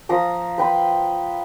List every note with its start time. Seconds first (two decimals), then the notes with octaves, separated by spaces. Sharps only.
0.09 F3 A#5 D#6
0.58 B4 G5 B5 C6